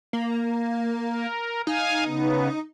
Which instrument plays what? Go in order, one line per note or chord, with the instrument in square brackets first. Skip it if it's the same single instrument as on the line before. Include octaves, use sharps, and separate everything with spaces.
[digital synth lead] A#3
[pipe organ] A#4
[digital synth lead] D#4 [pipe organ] F5 G#5
[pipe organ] C#3 B3